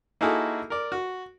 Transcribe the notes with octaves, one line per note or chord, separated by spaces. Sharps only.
A#3 D#4 E4 F#4 G#4 A4
A#4 D5
F#4